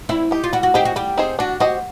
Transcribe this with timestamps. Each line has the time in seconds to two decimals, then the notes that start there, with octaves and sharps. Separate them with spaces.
0.09 C4 E4
0.31 D#4 G4
0.44 F4
0.53 G3 F#4
0.63 F#4
0.74 C4 D#4 G4 G#4 C5
0.85 F#4
0.96 G3 G4
1.17 C4 D#4 G#4 C5
1.39 D4 F#4
1.60 F#4 G4 C5 D#5